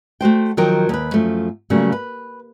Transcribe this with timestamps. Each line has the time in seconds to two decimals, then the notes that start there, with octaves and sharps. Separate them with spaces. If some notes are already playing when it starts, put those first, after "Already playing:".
0.21 A3 F#4 C5 G5
0.57 D#3 F3 F#3 A#4 G5
0.89 D#2 B4
1.14 F#2 F3 A3
1.70 C#3 F#3 G3 A3 A#3
1.92 B4